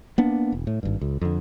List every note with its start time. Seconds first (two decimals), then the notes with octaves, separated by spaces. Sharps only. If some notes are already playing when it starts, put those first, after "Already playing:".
0.18 A#3 B3 D4
0.52 E1
0.67 A2
0.83 G#1 G2
1.01 C#2
1.21 F2 D3